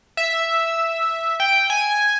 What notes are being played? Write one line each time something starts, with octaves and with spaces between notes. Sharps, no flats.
E5
G5
G#5